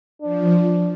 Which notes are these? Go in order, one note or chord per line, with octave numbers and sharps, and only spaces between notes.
F3 D4